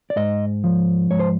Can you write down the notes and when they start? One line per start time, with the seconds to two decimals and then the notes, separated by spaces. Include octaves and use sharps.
0.10 D5
0.16 G#2 D#5
0.64 F3
1.11 G#2 C#5
1.19 C5